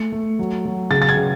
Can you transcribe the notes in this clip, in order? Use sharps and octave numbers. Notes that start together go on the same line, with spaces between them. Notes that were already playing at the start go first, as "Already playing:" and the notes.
Already playing: A3 C#7
A3
F#3
F#3
C#3 A6
A6
G#6
C#3